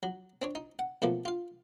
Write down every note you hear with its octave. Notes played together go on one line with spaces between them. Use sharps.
F#3
C4 D4 C#5
D#4
F#5
B2 F3 A3 A#3
F4 F5